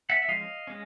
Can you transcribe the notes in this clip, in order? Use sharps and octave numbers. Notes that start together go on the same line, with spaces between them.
E5 F#5
E5
F3 G#3 C#4 D#5 F5
G#3 C#4